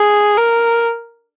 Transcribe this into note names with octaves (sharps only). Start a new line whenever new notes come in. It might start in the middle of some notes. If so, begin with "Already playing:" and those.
Already playing: G#4
A#4